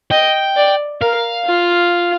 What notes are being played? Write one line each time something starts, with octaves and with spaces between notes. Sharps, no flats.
D#5 G5
D5
A#4 F5
F4